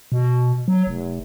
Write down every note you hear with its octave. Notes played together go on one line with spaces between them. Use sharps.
B2
F#3
F1